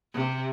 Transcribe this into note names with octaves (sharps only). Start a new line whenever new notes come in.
C3